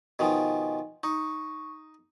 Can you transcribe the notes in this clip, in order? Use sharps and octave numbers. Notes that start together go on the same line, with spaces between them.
B2 D#3 F3 D#5 G#5
D#4 C#6